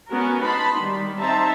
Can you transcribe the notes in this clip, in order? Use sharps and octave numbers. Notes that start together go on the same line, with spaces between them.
B3 C#4 F#4 A#4
D#4 A5 B5 C6
D#3 G3
C4 D#4 C5 E5 A5 A#5